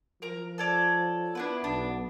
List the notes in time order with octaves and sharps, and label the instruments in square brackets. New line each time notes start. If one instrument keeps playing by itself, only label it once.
[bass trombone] F3 [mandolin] A#4 A#5
[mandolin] A4 C#5 D5
[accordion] B3 [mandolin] D4 E4 B4
[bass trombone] B1 [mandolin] D4